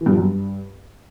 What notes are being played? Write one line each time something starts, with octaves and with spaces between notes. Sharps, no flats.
E3
G2
F3
F#2
G2